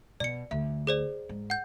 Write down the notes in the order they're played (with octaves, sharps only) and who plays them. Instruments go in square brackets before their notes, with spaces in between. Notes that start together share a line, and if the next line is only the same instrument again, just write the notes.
[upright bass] B2 [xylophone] D5 C#7
[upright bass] D2 [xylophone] E5
[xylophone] G#4 C5 D5
[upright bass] G#2
[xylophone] F#5 G6